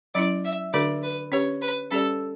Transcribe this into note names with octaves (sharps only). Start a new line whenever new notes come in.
F#3 C#4 E4 D5
E5
D3 A3 D4 F#4 A4 D5
B4
C#4 G4 B4 C#5
B4
G3 C#4 G4 A4 D5